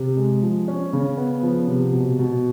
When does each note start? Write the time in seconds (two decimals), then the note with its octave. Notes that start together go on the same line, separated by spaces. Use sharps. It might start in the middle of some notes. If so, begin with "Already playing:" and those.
Already playing: C3
0.17 G#3
0.42 F3
0.68 C#4
0.93 C#3
1.17 B3
1.43 F3
1.68 C3
1.93 B2
2.19 B2